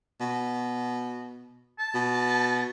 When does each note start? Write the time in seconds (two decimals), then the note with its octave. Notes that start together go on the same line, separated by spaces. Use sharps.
0.20 B2
1.79 A5
1.95 B2